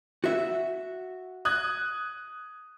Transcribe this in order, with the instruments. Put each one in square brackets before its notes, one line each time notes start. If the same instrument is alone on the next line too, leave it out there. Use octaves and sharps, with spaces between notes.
[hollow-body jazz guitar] F#4 E5
[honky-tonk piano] D#6 F#6 G#6